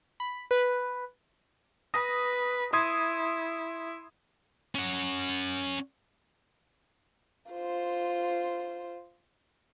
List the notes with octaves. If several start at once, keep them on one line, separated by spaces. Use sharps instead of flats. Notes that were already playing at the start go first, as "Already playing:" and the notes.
B5
B4
B4 D#6 A#6
E4 C6 D#6 G#6
C#4 F#5
F4 C5